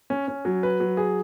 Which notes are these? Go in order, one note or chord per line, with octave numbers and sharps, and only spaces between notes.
C#4
C#4
F#3
B4
F#3
G#4